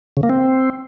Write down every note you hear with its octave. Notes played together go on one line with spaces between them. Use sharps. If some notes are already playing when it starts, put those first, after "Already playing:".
C#3
A#3
C4